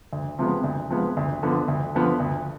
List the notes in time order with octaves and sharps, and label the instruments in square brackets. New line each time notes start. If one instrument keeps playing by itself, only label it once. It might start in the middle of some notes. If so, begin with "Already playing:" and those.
[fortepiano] D2
C3 F3 G#3 B3
D2
C3 F3 G#3 B3
D2
D3 F3 B3
D2
D3 F3 B3
D2